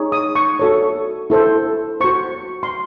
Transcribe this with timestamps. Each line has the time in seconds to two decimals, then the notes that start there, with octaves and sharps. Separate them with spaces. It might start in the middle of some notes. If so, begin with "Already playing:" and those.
Already playing: D#4 G#4 C#5
0.12 D#6
0.35 C#6
0.59 F#4 A4 C#5
1.30 E4 A4 C5
2.00 F#4 C5 C#6
2.63 C6